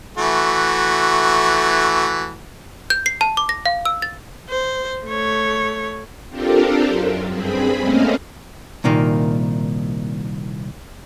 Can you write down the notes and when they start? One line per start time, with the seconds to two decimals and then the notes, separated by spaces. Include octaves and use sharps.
0.17 E3 A3 F#4
2.90 G6
3.06 C7
3.21 A5
3.37 D6
3.49 A#6
3.66 F5
3.85 E6
4.02 A6
4.50 C5
5.05 A3 C#5
6.30 C4 D4 F4 G4 A4 A#4
6.86 F#2
7.28 G2 C4 G#4 B5
7.79 A3 A#3 C4 C#4 D#5 F5
8.84 C2 A#2 D#3 A#3